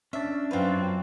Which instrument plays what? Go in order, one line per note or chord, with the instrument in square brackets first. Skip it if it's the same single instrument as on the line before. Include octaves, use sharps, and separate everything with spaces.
[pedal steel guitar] C#4 D4 [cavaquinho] E5
[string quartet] F#2 C4 [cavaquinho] F4 B4